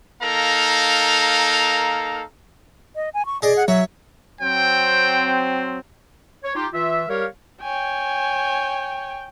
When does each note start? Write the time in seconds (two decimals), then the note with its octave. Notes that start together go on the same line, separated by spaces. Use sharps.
0.21 A#3 D#4 A4 A#4 F5 A#5
2.96 D#5
3.14 G#5
3.26 C#6
3.42 G#4 D5 D#5
3.56 F#5
3.68 F#3 C#5 E5
4.41 F#3 C4 G5
6.43 C#5
6.55 D#4 F4 G4
6.72 E3 F4 E5
7.08 G3 G4 A#4 C#5 F5
7.62 C#5 G5 G#5